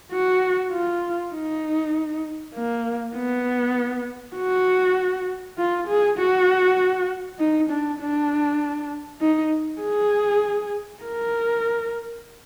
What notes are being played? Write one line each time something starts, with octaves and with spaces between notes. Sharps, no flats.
F#4
F4
D#4
A#3
B3
F#4
F4
G#4
F#4
D#4
D4
D4
D#4
G#4
A#4